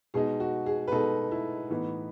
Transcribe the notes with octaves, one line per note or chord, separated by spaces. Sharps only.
B2 G#3 D#4 G#4
F#4
G#4
B4
B2 G#3 D#4 A4
E4
A2 E3 B3 D#4